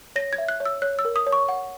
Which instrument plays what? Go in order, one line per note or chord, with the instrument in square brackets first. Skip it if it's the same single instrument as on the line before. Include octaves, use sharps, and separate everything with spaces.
[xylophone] C#5 A#6
G#6
E5
F#6
C#5
E6
C#5 F#6
E6
A#4
D#6
C#5
C#6
F#5